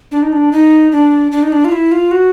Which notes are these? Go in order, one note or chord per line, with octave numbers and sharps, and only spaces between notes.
D4
D#4
D4
D#4
D4
D4
D#4
D4
F4
E4
F4
F#4